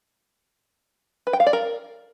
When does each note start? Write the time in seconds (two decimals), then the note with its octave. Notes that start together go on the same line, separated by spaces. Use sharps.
1.27 B4
1.33 G5
1.40 F5
1.46 D5
1.53 A#4